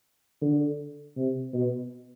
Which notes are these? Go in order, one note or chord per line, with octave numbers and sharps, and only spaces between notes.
D3
C3
B2